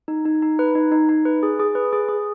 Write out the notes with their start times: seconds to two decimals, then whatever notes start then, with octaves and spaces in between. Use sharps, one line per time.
0.08 D#4
0.25 D#4
0.42 D#4
0.59 B4
0.75 D#4
0.92 D#4
1.09 D#4
1.25 B4
1.43 G#4
1.60 G#4
1.75 B4
1.93 G#4
2.09 G#4